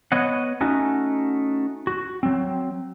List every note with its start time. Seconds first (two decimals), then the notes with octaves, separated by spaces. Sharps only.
0.12 B3 C#5 D#5 F#5
0.61 A3 C#4 D#4 F#4
1.87 F#4
2.23 F#3 C4